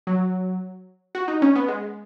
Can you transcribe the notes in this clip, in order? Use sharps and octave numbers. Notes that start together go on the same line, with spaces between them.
F#3
F#4
D#4
C#4
B3
G#3